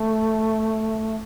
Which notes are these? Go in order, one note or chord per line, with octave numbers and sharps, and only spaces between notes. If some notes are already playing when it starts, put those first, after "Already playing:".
Already playing: A3